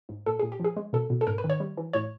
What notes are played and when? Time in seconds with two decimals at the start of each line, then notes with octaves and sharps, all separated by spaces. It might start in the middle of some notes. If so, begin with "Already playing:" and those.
0.09 G#2
0.26 A#2 A4
0.39 A#2 G#4
0.52 G4
0.60 F3 G#4
0.77 G#3
0.93 B2 A4
1.10 B2
1.21 A4
1.27 G#2 A#4
1.38 B4
1.44 D#3
1.50 C#5
1.60 G3
1.77 E3
1.93 A2 C#5